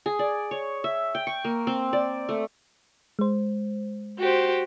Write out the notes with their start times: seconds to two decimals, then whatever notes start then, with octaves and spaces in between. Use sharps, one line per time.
0.06 G#4
0.19 D5
0.51 C#5
0.84 E5
1.15 G5
1.27 C#6
1.45 A#3
1.67 C4
1.93 D5
2.29 A3
3.19 G#3 C5
4.19 F#4 G4 C5